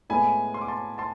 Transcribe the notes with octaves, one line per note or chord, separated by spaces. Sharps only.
A2 G#3 B3 G#5 B5
C6
D6
A5 C6
A5 C6